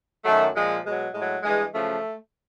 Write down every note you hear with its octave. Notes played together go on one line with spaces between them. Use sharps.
F#2 D#3 F#3 A3
A#2 F3 G#3
B2 F#3 G#3
A2 F#3 G#3
G2 E3 G#3
F#2 C#3 F3 A3